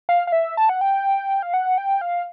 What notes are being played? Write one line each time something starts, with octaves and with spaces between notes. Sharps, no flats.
F5
F5
E5
A5
F#5
G5
F5
F#5
G5
F5